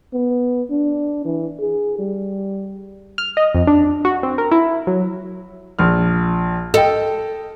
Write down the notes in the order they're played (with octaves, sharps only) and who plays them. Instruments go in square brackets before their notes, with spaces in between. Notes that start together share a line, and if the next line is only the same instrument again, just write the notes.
[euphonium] B3
D4
E3
G#4
G3
[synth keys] F6
D#5
F2
D4
F#4
C4
A#4
E4
F#3
[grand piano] A#1 F6
[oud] A4 [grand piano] D#5 G5